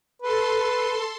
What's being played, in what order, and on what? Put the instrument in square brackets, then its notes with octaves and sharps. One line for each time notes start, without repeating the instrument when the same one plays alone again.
[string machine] A4 C6 [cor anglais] B4